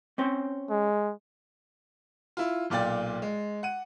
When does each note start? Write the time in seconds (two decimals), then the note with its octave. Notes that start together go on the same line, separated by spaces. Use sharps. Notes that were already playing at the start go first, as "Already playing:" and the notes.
0.18 C4 C#4 C5
0.70 G#3
2.37 E4 F4
2.70 B1 A#2 F4 D5 G5 A6
3.22 G#3
3.63 F#5 D#7